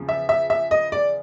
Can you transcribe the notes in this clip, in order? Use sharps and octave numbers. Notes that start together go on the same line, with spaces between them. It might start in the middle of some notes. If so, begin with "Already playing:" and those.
Already playing: E2 C#3 F3
E5
E5
E5
D#5
D5